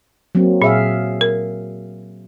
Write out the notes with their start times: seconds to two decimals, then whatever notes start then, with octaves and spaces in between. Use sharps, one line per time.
0.35 F#3 A#3 C4
0.62 A#2 G#4 E5 F5
1.21 A#4